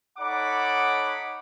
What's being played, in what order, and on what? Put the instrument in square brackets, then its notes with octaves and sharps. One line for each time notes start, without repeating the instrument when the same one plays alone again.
[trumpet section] D#4 A4 C#5 F#5 B5 D6